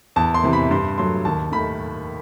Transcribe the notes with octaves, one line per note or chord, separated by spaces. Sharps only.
E2 A5
C6
C3 E3
B5
G2 C6
F#3 A3 C6
D#2 A5
D#3 A3 B5